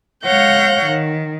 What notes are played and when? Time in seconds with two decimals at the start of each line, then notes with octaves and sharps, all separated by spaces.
0.24 G#3 C#5 F5 F#5 G6 A#6
0.85 D#3